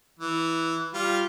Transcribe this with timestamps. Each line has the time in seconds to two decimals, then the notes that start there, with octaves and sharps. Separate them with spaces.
0.19 E3
0.94 G3 F4